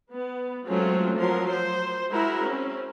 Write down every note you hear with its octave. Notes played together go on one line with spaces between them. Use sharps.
B3
F#3 G#3 A3 C4 C#4 F4
F3 F#3 A#4 C6
C5
G#3 E4 F#4 G#4 A#4
C4 C#4